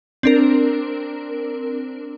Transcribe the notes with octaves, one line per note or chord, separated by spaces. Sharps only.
C4 D4 A#4